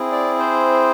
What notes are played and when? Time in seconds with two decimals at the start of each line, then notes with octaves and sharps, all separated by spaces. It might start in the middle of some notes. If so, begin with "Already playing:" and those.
Already playing: C4 E4 G#4
0.12 D5
0.39 C5